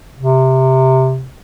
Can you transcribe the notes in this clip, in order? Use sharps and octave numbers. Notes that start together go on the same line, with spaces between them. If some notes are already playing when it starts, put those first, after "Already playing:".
C3